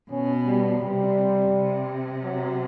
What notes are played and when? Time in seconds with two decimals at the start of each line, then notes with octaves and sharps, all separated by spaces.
0.10 B2 C#4
0.46 G3
0.80 C3 G3
1.52 C3
2.23 F#3